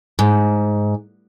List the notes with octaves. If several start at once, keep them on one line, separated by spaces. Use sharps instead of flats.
G#2